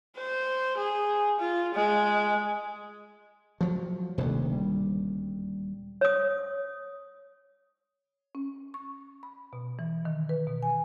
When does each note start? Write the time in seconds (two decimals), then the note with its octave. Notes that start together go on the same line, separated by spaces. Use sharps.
0.17 C5
0.77 G#4
1.39 F4
1.75 G#3
3.61 F3 F#3
4.18 D#1 D2 C3 D#3
4.52 G3
6.01 C#5 D#6
8.35 C#4
8.74 C#6
9.23 B5
9.53 B2
9.79 E3
10.05 D#3
10.29 B4
10.47 B2
10.63 G#5